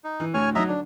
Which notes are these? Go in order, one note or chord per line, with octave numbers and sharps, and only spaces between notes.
D#4
E3
D2 A2 C#5 G#5 F6
F#3 D#4 D#5 E5 A#5
D3 D4